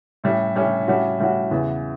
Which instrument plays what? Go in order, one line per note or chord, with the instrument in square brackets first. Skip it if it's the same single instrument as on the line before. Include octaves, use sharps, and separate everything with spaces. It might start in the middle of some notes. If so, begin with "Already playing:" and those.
[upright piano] A2 G3 C#4
A2 G3 C#4
A2 G3 C#4 F#4
A2 G3 C#4 F#4
E2 C#3 E3 B3